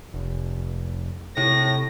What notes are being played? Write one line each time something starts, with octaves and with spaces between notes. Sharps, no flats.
F1
A2 C3 A#6